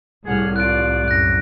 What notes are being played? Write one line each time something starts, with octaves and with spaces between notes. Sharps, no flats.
C2 A2 G#4 F#5 F6
F4 D5 F#6 D7
F#2 F#6 A#6